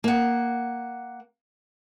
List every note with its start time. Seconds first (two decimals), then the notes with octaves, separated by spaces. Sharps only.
0.04 A#3 F#5